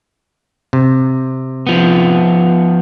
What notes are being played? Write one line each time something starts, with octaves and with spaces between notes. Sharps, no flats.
C3
F3 B3